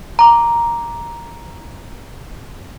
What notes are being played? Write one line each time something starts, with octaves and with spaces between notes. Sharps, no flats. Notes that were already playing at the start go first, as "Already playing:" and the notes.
A#5 D6